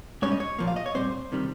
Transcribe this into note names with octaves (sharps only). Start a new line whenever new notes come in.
G#2 G3 C#4 C#5
D#5
C#5
A#2 F3 A#3
F5
D#5
C#5
A#2 G3 C4 C5
C3 D#3 G3